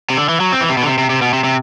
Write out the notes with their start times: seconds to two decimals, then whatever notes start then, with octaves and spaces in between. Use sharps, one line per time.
0.10 C3
0.17 D3
0.29 E3
0.40 F#3
0.53 C4
0.60 E3
0.69 C3
0.77 B2
0.83 D3
0.86 C3
0.98 C3
1.10 C3
1.22 B2
1.33 C3
1.44 C3